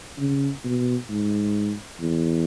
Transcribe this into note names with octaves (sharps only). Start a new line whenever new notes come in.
C#3
B2
G#2
E2